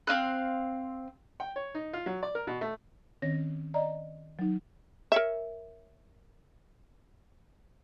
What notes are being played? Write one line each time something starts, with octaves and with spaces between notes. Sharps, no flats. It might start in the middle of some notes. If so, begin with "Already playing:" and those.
C4 C#4 F5 F#6
G5
C#5
D#4
F4
F#3
D5
A#4
B2
A3
D#3 C4 C#4 C#5 A#6
D5 D#5 A#5
F#3 D#4
A#4 C#5 E5